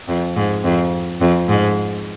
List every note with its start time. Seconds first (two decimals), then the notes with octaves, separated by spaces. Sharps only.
0.08 F2
0.36 G#2
0.65 F2
1.21 F2
1.49 G#2